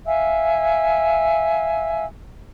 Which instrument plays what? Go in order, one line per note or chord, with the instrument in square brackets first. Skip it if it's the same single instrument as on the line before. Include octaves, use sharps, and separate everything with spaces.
[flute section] E5 F5 G#5 E6